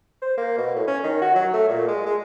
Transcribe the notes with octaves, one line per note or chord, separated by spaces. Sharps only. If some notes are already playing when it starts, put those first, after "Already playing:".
C5
A#3
B2
A2
C#4
D#3
F#4
F#3
A3
A#2
G#3
G#3